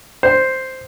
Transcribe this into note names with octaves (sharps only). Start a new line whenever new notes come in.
C5